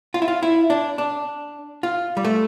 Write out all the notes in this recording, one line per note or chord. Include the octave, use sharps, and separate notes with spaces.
F4
E4
F4
E4
D4
D4
F4
G3
A3